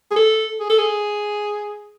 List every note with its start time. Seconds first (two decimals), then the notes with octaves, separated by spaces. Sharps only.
0.11 G#4
0.16 A4
0.60 G#4
0.70 A4
0.78 G#4